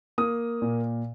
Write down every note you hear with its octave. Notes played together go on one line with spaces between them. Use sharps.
A#3 D#6
A#2